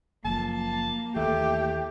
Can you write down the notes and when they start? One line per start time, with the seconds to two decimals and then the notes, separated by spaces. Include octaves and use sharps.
0.25 F#1 F#2 F3 A#3 A5
1.16 D#2 E3 A3 G4